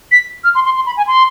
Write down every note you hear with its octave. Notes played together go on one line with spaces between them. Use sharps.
B6
F6
C6
C6
C6
B5
G#5
C6